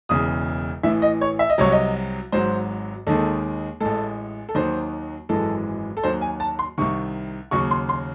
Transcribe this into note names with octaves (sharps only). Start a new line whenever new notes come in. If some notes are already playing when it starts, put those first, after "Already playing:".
E1 E2 C#3 D#6
A1 A2 E3 E5
D#5
C#5
E5
D#5
C2 C3 F#3 C#5
D#5
G#1 G#2 F#3 C5
D#2 D#3 G#3 A4
A1 A2 G#3 A4
A4
D#2 D#3 F#3 C5
G#1 F#2 E3 G#3 A4
A4
D#2 D#3 F#3 C5
G#5
A5
C6
C2 C3 D#3 C#6
D#2 C#3 F#3 C#6
C6
C6